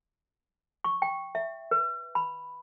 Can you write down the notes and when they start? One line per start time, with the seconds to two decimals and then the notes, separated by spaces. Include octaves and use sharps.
0.84 C#6
1.02 G5
1.35 E5
1.71 B4
2.15 B5